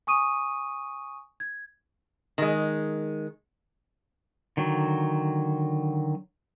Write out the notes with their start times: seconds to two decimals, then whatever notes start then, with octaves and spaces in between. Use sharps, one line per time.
0.07 G#5 C#6 D#6 D#7
1.40 G#6
2.38 D#3 G#3
4.57 D3 D#3 F#3